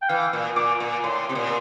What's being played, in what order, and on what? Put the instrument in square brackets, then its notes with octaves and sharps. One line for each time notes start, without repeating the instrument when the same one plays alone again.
[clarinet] G5
[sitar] E3 [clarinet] F5
[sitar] A#2
[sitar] A#2 [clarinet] D6
[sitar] A#2
[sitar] A2 [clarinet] C6
[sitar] C3
A#2